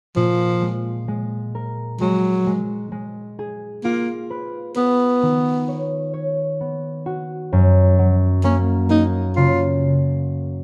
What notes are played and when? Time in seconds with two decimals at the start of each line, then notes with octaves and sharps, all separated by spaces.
0.16 A#2 F3
0.62 G#3
1.08 G#3
1.55 A#4
2.01 F#3 G#3
2.47 G#3
2.92 G#3
3.39 G#4
3.84 A#3 F4
4.30 B4
4.76 B3 B4
5.22 D#3
5.68 C#5
6.14 C#5
6.60 B3
7.06 F#4
7.53 F#2
7.99 F#3
8.44 A#3 C#4
8.90 A#3 D#4
9.36 C#3 F4